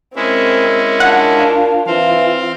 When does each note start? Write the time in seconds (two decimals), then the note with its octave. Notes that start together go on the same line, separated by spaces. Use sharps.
0.16 G#3 C4 C#4 E4 A#4
1.00 D4 F4 F#5
1.87 E3 C4 F4 C5 F5